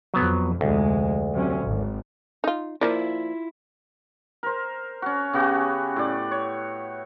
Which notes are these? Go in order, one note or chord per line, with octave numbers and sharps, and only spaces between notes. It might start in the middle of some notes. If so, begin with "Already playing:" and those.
F2 F#3 B3
F1 D2 G#3
C3 F#3 C#4
G#1
D#4 F4
F3 A#3 E4 F4 D5
A#4 C5
C#4 F#4
C#3 B3 F#4 G4
A2 D5
C#5